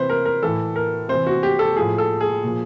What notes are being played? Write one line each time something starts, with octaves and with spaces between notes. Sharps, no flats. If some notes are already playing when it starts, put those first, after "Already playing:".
Already playing: C3 E3 B4 C5
A#4
A#4
A2 E3 A4
A#4
C3 E3 C5
F#4
G4
A4
A2 F3 G#4
A4
G#4
A#2 F3